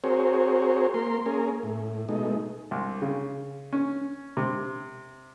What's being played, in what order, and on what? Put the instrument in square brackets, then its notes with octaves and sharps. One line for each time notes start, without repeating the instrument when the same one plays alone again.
[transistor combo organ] C4 F#4 G#4 A#4 C5 C#5
A#3 A#4 C6
A#3 C#4 G#4 A#4
A2
B2 G#3 A3 D#4
[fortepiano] C2
C#3
C#4
C3